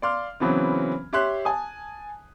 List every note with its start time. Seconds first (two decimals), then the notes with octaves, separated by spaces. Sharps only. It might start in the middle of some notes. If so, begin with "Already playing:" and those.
0.02 D5 F5 C6 D6 F6
0.40 C#3 E3 F#3 B3 C4
1.13 G4 C#5 E5 C6 F#6
1.45 G#5 A5 D#6